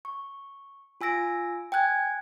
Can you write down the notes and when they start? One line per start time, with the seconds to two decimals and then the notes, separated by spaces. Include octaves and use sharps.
0.05 C#6
1.01 F4 G#5 E6 A#6 D7
1.72 G5 G#5 F#6 G#6